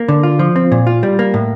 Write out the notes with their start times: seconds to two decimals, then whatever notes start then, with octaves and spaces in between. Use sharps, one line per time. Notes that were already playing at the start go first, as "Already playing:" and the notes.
Already playing: A#3
0.08 D3
0.23 F4
0.39 F3
0.56 C4
0.72 A#2
0.87 F4
1.03 G3
1.19 A#3
1.34 A2